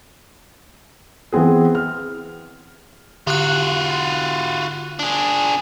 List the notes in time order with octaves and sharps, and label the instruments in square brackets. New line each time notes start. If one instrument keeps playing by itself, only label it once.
[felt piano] E3 B3 C4 G#4
F6
[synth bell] D3 F#6 [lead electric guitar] F4 F#4
[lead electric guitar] D4 G#4